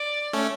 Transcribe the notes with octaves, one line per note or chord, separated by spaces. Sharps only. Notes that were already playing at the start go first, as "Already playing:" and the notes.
Already playing: D5
A3 C#4